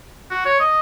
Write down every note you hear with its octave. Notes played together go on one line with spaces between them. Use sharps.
F#4
C#5
D#5